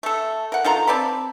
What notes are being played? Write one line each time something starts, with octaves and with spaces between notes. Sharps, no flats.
A3 A4
A#4 F#5
D#3 F4 A4 A#5
C4 D5 A5 B5